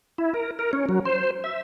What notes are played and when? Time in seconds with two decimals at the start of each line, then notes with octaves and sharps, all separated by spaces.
0.18 E4
0.34 A#4
0.59 A#4
0.73 C#4
0.89 F#3
1.05 C5
1.44 E5